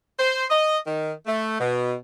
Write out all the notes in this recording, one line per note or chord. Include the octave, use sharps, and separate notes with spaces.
C5
D#5
D#3
A3
B2